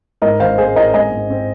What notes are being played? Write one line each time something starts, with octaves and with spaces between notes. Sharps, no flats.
G#2 A#4 D#5
G#1 C5 F5
G#3 G#4 C5
C4 A#4 D#5
G#3 D#5 G#5
G#2
C4